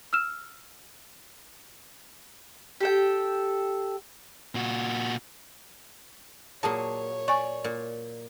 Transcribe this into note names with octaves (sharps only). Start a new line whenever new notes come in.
E6 F6 E7
G4 A4 G5
A#2 F#4
A#2 F#3 G#4 C#5 A5
D5 G#5 C#6
A#2